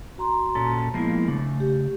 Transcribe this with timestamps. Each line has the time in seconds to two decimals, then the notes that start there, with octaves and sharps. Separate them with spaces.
0.18 F#4 A#5 C6
0.55 A#2 C#4 A4
0.94 F3 G#3 A#3 B3 E4
1.28 C#3 A3 D4
1.60 G4